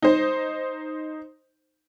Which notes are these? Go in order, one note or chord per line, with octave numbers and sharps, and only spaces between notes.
D#4 C5